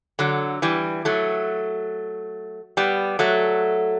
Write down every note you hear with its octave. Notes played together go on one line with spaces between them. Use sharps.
D3 F#3
E3 G3
F#3 A3
G3 B3
F#3 A3